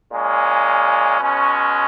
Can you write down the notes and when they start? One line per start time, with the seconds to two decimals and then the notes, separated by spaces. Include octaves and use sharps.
0.11 A#2 G#3 C#4
1.19 B2 G#3 C#4